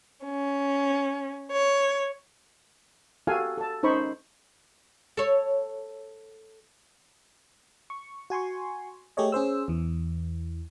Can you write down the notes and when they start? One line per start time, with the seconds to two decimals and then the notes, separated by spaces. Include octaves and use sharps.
0.24 C#4
1.51 C#5
3.27 F#4 G4 A4 F5 G#5
3.58 A4 A5
3.83 C#4 D#4 C5 B5 C#6
5.17 A4 C#5
7.90 C#6
8.30 F#4 G#5 C6 C#6
9.17 A3 G4 G#4 C#5 D#5
9.32 C#4 G#4 C5 E6
9.68 E2 E3